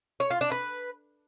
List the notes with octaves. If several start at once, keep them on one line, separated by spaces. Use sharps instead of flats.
C#5
F4
D4
B4